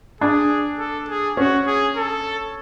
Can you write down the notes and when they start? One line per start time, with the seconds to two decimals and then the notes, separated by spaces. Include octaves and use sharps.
0.21 D4 G#4
0.79 A4
1.09 G#4
1.37 C#4 F#4
1.67 G#4
1.96 A4